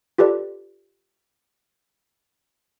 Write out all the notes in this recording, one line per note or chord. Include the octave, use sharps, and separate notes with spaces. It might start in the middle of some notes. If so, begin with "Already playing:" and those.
F4 G4 A4 B4 D5